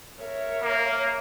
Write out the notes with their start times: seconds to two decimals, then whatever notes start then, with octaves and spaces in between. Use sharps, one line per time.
0.20 A#4 C#5 E5
0.62 A#3